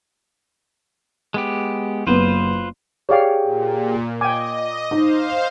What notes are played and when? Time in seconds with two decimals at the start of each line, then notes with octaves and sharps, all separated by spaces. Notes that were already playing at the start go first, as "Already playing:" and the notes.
1.34 G#3 B3 G4
2.07 F#1 B3 F4 B4 C5
3.09 G4 G#4 C#5 D5 F5 G5
3.43 A#2
4.21 D#5 G5 G#5 D6
4.91 D#4 C5 F5